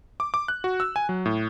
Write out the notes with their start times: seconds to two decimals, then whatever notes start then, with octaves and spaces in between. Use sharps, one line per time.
0.20 D6
0.34 D6
0.48 F#6
0.64 F#4
0.80 E6
0.96 G#5
1.09 F#3
1.26 A2